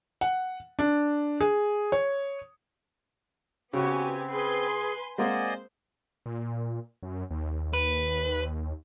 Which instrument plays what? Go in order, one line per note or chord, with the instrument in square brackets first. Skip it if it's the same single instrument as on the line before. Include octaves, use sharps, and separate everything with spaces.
[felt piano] F#5
D4
G#4
C#5
[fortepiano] C#3 [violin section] B3 G4 G#5 [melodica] C4 [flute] F#4
[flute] G#4 [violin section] B4 G#5 C6
[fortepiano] G#3 A#3 C4 [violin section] C5 [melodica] D5 D#5 G#5 [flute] F#5
[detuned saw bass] A#2
F#2
D#2
[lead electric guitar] B4